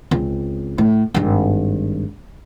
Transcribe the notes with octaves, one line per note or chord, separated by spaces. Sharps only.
C#2 C4
A2
G#1 G2